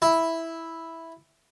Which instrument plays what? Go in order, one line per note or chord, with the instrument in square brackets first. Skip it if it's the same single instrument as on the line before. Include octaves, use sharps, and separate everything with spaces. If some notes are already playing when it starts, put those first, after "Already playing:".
[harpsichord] E4